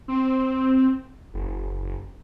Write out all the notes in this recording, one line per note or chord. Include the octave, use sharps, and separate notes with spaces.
C4
F#1